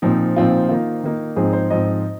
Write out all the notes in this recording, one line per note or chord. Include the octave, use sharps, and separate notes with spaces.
A#2 F3 C4 D#4
A#2 F3 C4 D#4 F4
D#3 A#3 D#4 F4
D#3 A#3 D#4
G#2 F3 C4 D#4 G#4
C5
G#2 F3 C4 D#4 D#5